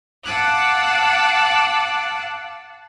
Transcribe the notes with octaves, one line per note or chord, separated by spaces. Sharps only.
F5 F#5 A5 D6 E6 F#6